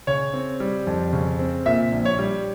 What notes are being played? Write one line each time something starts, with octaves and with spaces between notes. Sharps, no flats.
C#3 C#5
C4
G3
F2
C#3
C4
A#2 E5
A#1
C#5
G3